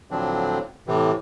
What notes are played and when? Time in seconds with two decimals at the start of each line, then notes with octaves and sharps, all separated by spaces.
0.11 A2 D3 F3 F#3 C4 D4
0.87 A2 C3 E3